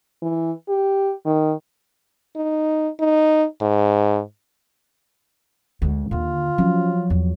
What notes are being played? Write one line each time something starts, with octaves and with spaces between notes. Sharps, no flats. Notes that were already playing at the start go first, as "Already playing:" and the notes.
E3
G4
D#3
D#4
D#4
G#2
D2 G#3
D#2 D3 F4
F3 F#3 C#4
E2